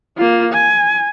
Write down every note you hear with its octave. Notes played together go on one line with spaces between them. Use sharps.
A#3 F4
G#5